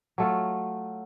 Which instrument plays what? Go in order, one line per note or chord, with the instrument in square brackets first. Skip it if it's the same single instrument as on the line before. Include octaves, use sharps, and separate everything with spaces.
[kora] F#3 A3 F4